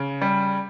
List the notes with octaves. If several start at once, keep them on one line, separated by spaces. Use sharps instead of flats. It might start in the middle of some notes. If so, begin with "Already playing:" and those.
Already playing: C#3
G3